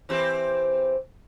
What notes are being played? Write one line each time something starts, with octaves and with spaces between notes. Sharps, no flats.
E3 C4 G4